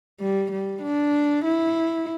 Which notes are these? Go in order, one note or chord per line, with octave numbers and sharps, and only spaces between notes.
G3
G3
D4
E4